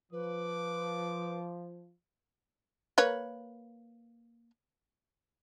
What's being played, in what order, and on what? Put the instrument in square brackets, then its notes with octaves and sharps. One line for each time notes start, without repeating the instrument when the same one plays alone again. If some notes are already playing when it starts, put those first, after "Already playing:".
[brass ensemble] F3 [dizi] B4 [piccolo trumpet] D6
[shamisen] A#3 B4 C#5